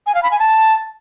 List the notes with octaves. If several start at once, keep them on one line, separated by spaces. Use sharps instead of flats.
G#5
F5
B5
G#5
A5